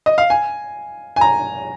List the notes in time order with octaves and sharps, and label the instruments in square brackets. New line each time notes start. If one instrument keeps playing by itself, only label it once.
[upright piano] D#5
F5
G#5
G#5
A#5